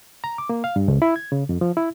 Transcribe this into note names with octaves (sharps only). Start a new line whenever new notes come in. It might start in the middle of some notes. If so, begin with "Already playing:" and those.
A#5
D6
A#3
F5
G2
C#2
E4
G#6
C#3
F2
F3
E4